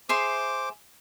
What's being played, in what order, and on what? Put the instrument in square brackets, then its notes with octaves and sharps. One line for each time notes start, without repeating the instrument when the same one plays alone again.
[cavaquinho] G#4 E5 C6 [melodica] C5 D6